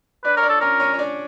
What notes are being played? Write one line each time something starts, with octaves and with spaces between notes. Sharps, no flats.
D4 B4 D5
A#4 C#5
D4 D5
A4
C#4 A#4 C#5
C#4 C#5
C#5
D4 D5